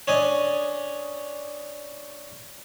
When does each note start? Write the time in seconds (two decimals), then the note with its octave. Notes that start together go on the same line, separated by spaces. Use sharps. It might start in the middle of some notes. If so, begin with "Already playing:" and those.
0.08 C#4 D4 D#5